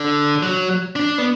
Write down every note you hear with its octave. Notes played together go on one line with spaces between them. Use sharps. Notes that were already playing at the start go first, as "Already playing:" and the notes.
Already playing: D3
F#3
D4
B3